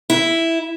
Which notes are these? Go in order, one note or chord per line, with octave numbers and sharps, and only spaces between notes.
E4